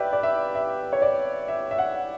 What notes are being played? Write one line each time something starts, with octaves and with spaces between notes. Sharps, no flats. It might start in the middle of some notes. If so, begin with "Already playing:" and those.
Already playing: G4 B4 D5 E5
D5
E5
E5
C#5
D5
E5
E5
F#5